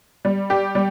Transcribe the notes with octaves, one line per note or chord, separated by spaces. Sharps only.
G3
G4
G3